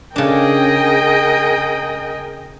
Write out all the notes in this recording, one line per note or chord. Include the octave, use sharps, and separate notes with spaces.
C#3 D4 G#4 A#4 D#5 G5